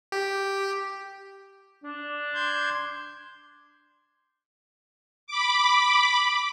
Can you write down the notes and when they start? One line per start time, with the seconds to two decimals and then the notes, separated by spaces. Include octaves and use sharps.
0.12 G4
1.84 D4
2.34 C6 G6 G#6
5.27 B5 D6